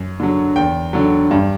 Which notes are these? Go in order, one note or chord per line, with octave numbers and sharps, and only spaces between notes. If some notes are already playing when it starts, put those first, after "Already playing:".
Already playing: F#2
D3 F#3
E2 G5
D3 F#3
G2